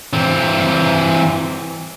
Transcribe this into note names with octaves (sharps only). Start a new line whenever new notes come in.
E3 C4